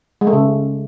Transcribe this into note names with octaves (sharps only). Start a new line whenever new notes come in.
G#3
A3
C#3